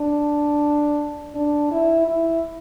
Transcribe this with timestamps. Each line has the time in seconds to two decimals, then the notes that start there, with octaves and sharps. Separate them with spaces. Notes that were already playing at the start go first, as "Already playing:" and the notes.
Already playing: D4
1.35 D4
1.71 E4
2.08 E4